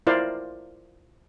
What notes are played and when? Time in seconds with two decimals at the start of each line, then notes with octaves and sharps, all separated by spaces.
0.07 E4 F4 A#4 C5 D5 F5